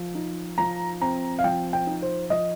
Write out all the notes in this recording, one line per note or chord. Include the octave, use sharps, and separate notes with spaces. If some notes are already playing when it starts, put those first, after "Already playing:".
Already playing: F3
D#4
F3 A#5
C4 A#5
F5
F3 G5
G5
D#4
C5
F3 D#5